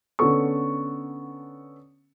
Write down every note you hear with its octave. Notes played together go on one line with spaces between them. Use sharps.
D3 B3 C#4 A4 C#6